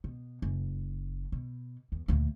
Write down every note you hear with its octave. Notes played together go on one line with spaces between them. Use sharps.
B2
F#1
B2
E2
D2 A#2